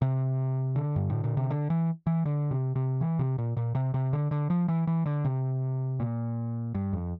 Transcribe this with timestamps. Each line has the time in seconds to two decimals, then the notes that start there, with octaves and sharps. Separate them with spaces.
0.02 C3
0.76 D3
0.96 G2
1.10 A2
1.24 A#2
1.37 C3
1.50 D3
1.70 E3
2.07 E3
2.25 D3
2.51 C3
2.75 C3
3.01 E3
3.19 C3
3.38 A#2
3.57 A#2
3.75 C3
3.94 C3
4.13 D3
4.31 D3
4.50 F3
4.68 E3
4.87 E3
5.06 D3
5.24 C3
6.00 A#2
6.75 G2
6.93 F2